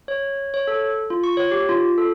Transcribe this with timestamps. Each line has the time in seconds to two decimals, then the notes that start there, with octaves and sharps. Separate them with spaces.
0.08 C#5
0.54 C#5
0.68 A4
1.10 F4
1.24 C#6
1.37 C#5
1.51 G4
1.69 F4
1.98 A4